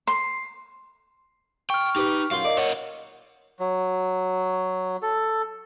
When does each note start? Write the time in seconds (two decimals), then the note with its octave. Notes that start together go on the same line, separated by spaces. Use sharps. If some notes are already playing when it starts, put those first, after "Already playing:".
0.07 C6
1.70 G5 C#6 F6
1.96 D#4 G4 B4
2.31 F#2 F4 F5 C6
2.45 A#4 D5 D#5
2.57 A#2 C#5 F#5
3.60 F#3
5.02 A4